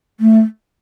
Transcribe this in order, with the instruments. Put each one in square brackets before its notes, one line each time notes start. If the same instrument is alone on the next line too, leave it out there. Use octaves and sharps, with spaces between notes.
[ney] A3